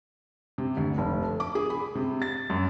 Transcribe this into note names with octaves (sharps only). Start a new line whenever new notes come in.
C3
D2
F1
A3
D6
G#4
B5
C3
A6
F#2